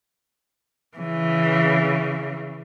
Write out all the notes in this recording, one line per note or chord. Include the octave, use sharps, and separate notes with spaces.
C#3 E3